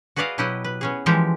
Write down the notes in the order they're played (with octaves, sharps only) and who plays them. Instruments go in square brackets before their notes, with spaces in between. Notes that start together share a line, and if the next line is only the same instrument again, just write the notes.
[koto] F#4 G#4 B4 D5 D#5 F5
B2 F#3 E4 G4 B4 D#5
B4
B3 C#4 G#4
E3 F3 G#3 G4 A#4